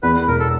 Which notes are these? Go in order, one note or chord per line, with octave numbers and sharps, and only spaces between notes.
E2 B4
B4
E1 A#4
A4